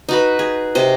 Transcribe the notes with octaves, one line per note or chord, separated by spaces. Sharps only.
D#4 F#4 B4
G#4
C3 D#5